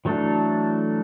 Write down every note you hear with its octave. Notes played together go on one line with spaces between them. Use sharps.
E3 F#3 A3 D4 A4